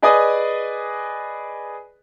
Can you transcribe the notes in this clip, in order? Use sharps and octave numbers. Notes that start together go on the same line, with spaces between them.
G#4 B4 D5 D#5 G#5 D#6